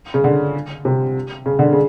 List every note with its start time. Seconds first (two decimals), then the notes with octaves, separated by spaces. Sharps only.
0.14 C#3
0.24 D3
0.85 C3
1.46 C#3
1.59 D3
1.73 C#3